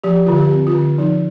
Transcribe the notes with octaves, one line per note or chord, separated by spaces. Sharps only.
F3 G4
D3 F4
G4
C4
F4
D3
F3 D#4